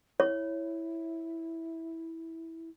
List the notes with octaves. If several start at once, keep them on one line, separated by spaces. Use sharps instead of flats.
E4 C#5